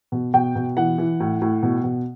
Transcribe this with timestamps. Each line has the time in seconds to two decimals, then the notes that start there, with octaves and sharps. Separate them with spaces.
0.12 B2
0.34 B2 G5
0.55 B2
0.77 E3 F#5
0.98 E3
1.20 A2
1.42 A2
1.63 B2
1.84 B2